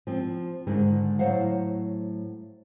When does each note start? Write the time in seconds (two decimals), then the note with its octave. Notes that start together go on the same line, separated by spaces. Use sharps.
0.07 F3 C4
0.67 G#2 D3 D#3 G#3
1.19 A2 F#3 C5 F5 F#5